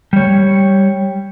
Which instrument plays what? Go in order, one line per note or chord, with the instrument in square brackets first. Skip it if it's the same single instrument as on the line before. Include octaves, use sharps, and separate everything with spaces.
[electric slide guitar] G3 C#5